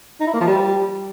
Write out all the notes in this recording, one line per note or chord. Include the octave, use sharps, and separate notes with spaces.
D#4
E4
A#3
F3
G3